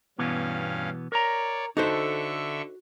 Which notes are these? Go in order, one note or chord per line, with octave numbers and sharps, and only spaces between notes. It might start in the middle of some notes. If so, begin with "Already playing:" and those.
G2 B2 E3 B3 C#4 F5
A#4 C#5 D5 A#5
D3 D#4 F#4 A4 C5 E5 C#6